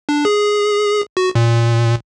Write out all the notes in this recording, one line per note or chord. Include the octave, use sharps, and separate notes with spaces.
D4
G#4
F#4
A#2